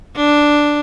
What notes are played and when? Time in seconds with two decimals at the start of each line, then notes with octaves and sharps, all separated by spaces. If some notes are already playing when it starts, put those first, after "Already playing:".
0.16 D4